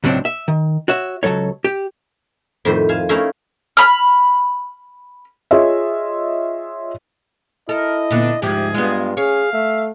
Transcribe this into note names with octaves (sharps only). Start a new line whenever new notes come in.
C#2 A2 F#3 C4 D4
E5
D#3
F#4 C#5 E5
C#2 C3 F#3 A4 C#5
G4
F2 A2 D#3 B4 C5
F5 G#5 A5
A3 C#4 D#4 E4 A#4 F5
B5 F6
F4 G#4 C#5 D#5 E5
E4 A4 A#4 D#5
A#2 D3 B3 D4
D2 G#2 F3 G4 G#4
G2 G#3 B3 F4
C#4 G#4 C#5 F5
A3 E5